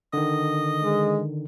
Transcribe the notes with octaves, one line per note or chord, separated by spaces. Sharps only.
D3 D#3 D#5
G#3